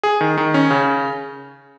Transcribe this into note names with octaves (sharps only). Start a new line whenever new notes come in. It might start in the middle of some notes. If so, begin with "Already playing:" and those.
G#4
D#3
D#3
C#4
C#3